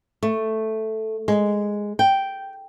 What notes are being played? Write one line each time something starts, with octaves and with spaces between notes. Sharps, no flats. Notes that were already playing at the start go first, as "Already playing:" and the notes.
A3
G#3
G5